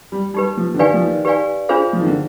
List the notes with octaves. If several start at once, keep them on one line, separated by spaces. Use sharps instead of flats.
G3
G3 D#4 G4 B4
F3
D3
D#3 G4 B4 D5 F5 G#5
F3
D#3
G4 B4 D5 F5 G#5
D4 F4 G#4 C5 F5
F3
D#3
D3